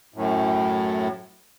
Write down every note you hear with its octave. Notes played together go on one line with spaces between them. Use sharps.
F#2 A2